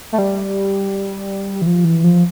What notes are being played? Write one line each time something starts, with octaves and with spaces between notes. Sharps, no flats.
A3
G3
E3
F3
E3
F3